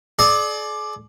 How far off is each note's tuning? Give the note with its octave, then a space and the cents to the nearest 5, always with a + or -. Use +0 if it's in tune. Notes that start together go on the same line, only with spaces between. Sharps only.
G#4 +45 D5 +10